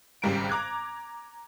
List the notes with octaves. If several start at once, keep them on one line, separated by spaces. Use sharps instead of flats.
G#1 G#2 C#3 G3 A#4 D7
A#5 D6 F#6 G#6